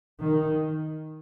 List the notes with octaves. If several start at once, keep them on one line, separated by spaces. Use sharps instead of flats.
D#3